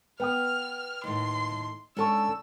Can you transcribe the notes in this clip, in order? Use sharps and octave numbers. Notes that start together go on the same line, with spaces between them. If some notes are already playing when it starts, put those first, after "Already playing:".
B3 B4 G5 D#6 F6
D#2 A2 C6
G#3 C#4 D4 A4 A5 C#6 E6